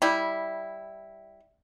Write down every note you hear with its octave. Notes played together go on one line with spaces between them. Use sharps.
G3 E4